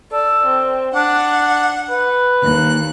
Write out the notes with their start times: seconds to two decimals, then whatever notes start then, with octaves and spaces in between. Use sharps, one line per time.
0.12 A4 D5
0.46 C4
0.95 D4 F#5
1.90 B4
2.44 D#2 F#6